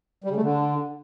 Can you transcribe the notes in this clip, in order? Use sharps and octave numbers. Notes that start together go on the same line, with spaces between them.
G3
C#3
A3
D3